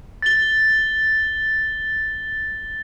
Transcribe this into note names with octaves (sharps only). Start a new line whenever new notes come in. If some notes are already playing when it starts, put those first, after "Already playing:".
A6 G7